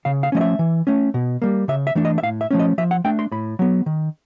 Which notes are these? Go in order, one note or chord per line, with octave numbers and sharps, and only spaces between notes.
C#3 F5
F5
F3 A3 C#4 D#5
E5
E3
A3 C#4
B2
G3 A#3
C#3 E5
E5
E3 A3 D4
D#5
E5
A2 F5
E5
F3 A3 C#4
D#5
F3 E5
F#5
A3 D4 G5
C6
A2 B5
F#3 B3
D#3